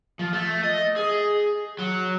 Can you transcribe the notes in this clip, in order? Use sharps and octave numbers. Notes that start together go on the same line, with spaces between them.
F3
A3
D#5
G#4
F#3